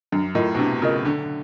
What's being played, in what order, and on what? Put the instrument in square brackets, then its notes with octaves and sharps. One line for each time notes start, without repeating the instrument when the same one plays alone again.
[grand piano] F#2 [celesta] D4
[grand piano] A2 [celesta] F4 A#4 D#5
[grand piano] B2
[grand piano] C3 [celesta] D4
[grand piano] C#3 [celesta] F4 A#4 D#5
[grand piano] D3 [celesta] D4